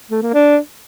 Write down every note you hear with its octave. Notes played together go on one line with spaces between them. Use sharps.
A3
A#3
D4